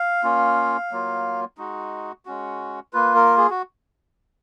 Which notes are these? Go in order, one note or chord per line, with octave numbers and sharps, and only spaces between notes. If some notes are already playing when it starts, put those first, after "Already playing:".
Already playing: F5
A#3 C#4 F4
F#3 A#3 F4
G#3 D#4 F#4
G#3 C#4 F#4
A#3 F4 B4
A#4
G#4
F#4